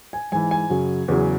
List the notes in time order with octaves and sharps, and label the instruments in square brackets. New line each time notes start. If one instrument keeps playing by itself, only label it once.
[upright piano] G#5
G#2 E3 G#5
G#5
F#2 C#3 F#3
E2 C#3 F#3